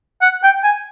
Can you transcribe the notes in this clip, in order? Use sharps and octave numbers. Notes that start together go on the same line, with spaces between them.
F#5
G5
G#5